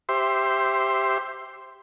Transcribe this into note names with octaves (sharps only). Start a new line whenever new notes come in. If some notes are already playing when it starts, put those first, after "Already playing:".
G4 C5 E5 C6